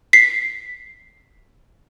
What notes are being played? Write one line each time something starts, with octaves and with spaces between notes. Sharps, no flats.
B6 C7